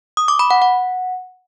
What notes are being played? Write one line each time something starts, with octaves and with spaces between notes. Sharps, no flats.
D#6
D6
B5
F#5
F#5